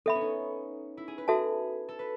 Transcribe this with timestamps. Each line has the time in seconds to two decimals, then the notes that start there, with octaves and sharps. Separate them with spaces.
0.06 B3 A4 E5 B5
0.15 C#4
0.21 D#4
0.97 E4
1.08 G#4
1.18 B4
1.28 F#4 G#4 A4 E5 A5
1.89 A4
1.99 B4